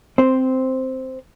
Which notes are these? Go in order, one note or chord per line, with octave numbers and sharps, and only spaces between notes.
C4 C5